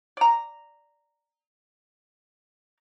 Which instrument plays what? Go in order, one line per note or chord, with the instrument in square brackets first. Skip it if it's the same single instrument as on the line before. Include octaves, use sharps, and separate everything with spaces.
[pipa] D5 A#5